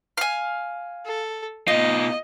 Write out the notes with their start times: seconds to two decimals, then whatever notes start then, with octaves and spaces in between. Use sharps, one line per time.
0.18 F5 G#5
1.06 A4
1.68 B2 D#4 F4 D#5